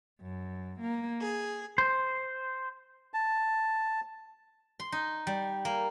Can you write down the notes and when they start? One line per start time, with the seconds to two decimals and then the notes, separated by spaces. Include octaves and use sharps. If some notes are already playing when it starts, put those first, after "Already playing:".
0.21 F#2
0.80 A#3
1.23 G#4
1.78 C5
3.14 A5
4.80 C6
4.92 D#4
5.27 G3
5.65 A#3